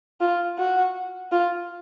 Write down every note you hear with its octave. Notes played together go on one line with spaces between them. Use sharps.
F4
F#4
F4